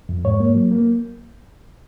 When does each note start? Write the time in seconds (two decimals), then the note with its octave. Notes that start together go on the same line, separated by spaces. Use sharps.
0.09 F2
0.25 G#2 C#5
0.40 A#3
0.55 F#3
0.71 A#3